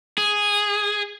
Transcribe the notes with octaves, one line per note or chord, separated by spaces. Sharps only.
G#4